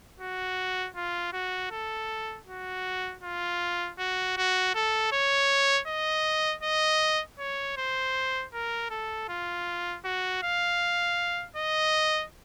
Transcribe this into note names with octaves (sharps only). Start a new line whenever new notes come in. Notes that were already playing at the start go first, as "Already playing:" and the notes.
F#4
F4
F#4
A4
F#4
F4
F#4
F#4
A4
C#5
D#5
D#5
C#5
C5
A#4
A4
F4
F#4
F5
D#5